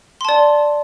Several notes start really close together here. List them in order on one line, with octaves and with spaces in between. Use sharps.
C6 A5 D5